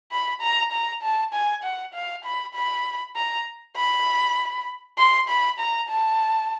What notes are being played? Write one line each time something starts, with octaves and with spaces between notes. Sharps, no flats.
B5
A#5
A#5
A5
G#5
F#5
F5
B5
B5
A#5
B5
C6
B5
A#5
A5